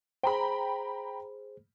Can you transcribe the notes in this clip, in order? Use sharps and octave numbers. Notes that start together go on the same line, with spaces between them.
G#4 C5 G5 A#5 B5